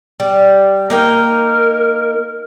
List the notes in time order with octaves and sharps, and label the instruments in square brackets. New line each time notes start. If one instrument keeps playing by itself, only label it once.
[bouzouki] G3
[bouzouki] A#3 D#4 G5 [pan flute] A#4